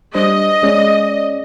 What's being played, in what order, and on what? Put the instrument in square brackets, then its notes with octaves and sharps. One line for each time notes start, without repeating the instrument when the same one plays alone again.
[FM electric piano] G3 D4 C5 [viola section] D#5
[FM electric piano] G#3 C#4 D5